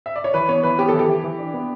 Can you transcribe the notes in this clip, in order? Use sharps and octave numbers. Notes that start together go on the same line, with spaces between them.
E5
D5
C#5
E3 B4
B3 C#5
E3 B4
B3 G4
E3 A4
G4
E3
E3
D4
B3